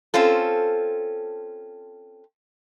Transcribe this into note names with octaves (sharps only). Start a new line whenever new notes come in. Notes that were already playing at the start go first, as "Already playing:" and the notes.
C4 C#4 F4 A4